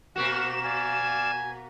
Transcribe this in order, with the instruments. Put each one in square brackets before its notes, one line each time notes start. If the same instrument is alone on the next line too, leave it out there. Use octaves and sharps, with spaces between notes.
[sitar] B2 A#3 F#4 [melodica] F#5 [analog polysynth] E7
[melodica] D5 F5 [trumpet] G#5